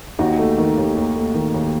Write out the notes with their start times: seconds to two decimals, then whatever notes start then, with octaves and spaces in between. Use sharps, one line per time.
0.19 D#2 D#4 F#4
0.38 A3
0.58 D#3
0.77 D#2
0.97 D#2
1.16 A3
1.34 D#3
1.54 D#2